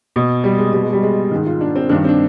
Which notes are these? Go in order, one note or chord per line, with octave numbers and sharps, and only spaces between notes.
B2
G3
G#3
B2 G3
G#3
G3
G#3
G#2 D#3
F4
D4
C4
G2 D#3 D4
C4
D4